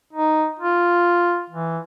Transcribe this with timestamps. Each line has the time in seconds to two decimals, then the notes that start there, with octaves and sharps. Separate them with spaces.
0.13 D#4
0.60 F4
1.50 E3